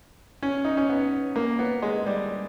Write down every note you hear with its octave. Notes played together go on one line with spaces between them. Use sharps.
C#4
D#4
C#4
B3
A#3
B3
G#3
G3